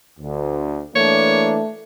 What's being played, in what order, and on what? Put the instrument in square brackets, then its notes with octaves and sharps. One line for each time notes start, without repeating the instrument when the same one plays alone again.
[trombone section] D2
[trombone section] E3 A#3 D4 [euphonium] A3 [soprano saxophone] C#5